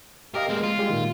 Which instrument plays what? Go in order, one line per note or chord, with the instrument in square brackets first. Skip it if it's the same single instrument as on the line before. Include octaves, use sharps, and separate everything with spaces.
[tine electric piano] G4 D#5 F5 [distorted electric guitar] A#4
[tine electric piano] G#3 [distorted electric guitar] A#3 C4
[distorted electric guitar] F4
[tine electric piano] G3 G#3 G4
A#2 D#3